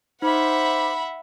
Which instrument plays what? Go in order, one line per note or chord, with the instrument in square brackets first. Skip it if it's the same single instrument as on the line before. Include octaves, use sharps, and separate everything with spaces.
[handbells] D#4 [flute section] C5 D6 [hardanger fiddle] E5 F#5 [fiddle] B5